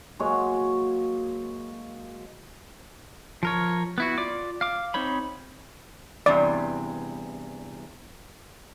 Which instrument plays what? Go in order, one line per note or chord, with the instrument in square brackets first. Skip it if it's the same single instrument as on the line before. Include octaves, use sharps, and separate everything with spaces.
[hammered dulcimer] F#3 G#3 A#3 C#5
[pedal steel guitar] F3 A#4 C#5
B3 E4 F#4
F4 D5 D6
F5 D6
C4 D#4 C5 C#5 B5
[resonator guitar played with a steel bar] E2 G2 C3 [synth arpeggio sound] D5